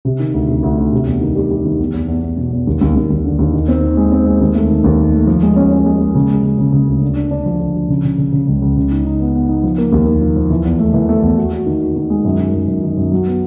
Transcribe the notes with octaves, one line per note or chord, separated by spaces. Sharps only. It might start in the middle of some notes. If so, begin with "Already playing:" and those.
C3
D#3
D2
C3
D2
D2
C3
E2
D#3
G3
G3
D#3
E2
E2
E2
E2
B2
E2
D#2
D#2
D#2
D#2
D3
D#2
D#3
C4
D#3
G#3
C4
G#3
D#2
A3
D#3
D#2
D#3
A3
F3
G#3
C#4
C#4
G#3
G#3
C#3
G#3
G#3
C#3
C#3
D2
D3
D4
D4
F3
D3
F3
C#3
C#3
C#3
C#3
C#2
C#2
C#3
D#4
D#4
B3
B3
D#4
F3
A#3
D#2
A#3
F3
F3
E3
E2
A3
E3
A3
E2
F#4
F#4
D#3
F#4
D#3
G#3
F#2
D#3
F#2
F#2
D#3
F#2
F#3
B3